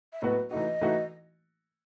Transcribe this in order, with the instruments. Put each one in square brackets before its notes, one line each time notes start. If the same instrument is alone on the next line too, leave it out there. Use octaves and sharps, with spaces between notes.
[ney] E5
[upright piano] A2 F#3 B3 F#4 B4 [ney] D#5
[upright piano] E3 A3 D#4 F#4 [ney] D#5
[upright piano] E3 A3 D#4 F#4